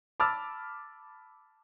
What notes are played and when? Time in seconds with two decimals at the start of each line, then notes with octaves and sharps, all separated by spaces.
0.20 A5 B5 D6 E6 F6 A6